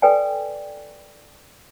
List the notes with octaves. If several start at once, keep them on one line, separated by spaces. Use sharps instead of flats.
A4 B4 D5 G5 G#5